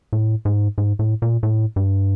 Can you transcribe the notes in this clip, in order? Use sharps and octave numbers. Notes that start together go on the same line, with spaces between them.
A2
G#2
G#2
A2
A#2
A2
G2